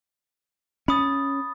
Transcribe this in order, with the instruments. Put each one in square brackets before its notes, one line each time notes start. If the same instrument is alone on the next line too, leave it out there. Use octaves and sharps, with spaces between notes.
[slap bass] C#4 [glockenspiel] B5 D#6 A6